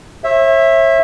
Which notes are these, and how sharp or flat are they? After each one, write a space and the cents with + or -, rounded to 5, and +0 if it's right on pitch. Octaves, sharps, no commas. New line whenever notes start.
C#5 -40 E5 +0